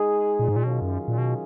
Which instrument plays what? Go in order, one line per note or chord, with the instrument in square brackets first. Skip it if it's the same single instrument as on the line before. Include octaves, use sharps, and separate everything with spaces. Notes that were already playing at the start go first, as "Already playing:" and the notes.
Already playing: [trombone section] G#3 D#4 G#4
[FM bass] A#2
G#2
A#2
[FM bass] B2 [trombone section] D#3 F#3 C#4 F4 G#4
[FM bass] F#2
A#2
B2